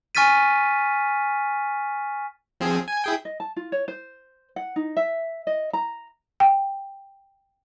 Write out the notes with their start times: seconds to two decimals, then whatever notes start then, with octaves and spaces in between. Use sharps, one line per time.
0.15 G#5 C#6 F6 A6 B6 D#7
2.60 F3 C4 G#4
2.88 G#5
3.04 E4 G#4 G5
3.25 D#5
3.40 A5
3.56 F4
3.72 C#5
3.88 C5
4.56 F#5
4.76 D#4
4.97 E5
5.47 D#5
5.73 A#5
6.40 G5